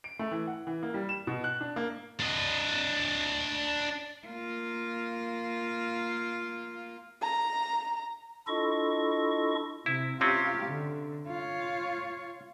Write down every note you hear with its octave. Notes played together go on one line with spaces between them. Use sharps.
D7
A3
E3
F#5
E3
A#3
G3
E7
B2
F#6
D4
A#3
D4 D#5
A#3 F4
A#5
D4 E4 F4 A4 D#5 C#6
C3 E4
C3 C4 C#4 F4 G4
D3
F4 C#5